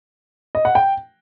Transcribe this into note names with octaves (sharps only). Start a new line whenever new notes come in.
D#5
F#5
G5